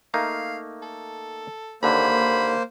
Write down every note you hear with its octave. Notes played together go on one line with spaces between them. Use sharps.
A3 A#3 D#4 F5
A4
D#2 D3 A#3 C5 B5